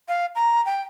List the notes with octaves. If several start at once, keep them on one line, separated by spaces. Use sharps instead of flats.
F5
A#5
G5